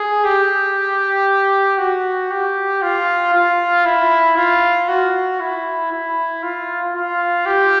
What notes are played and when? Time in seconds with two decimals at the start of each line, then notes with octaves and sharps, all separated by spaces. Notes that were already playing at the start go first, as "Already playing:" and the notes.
Already playing: G#4
0.24 G4
1.78 F#4
2.31 G4
2.82 F4
3.34 F4
3.85 E4
4.37 F4
4.88 F#4
5.40 E4
5.91 E4
6.43 F4
6.94 F4
7.46 G4